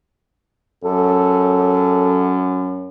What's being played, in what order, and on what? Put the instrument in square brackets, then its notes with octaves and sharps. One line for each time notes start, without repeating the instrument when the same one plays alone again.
[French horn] F#2 [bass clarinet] A4